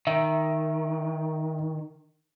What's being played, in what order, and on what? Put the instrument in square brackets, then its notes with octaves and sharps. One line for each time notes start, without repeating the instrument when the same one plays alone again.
[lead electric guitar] D#3 [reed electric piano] E5